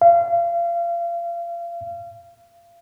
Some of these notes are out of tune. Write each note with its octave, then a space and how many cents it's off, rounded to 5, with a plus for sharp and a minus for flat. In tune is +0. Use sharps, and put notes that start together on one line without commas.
F5 -30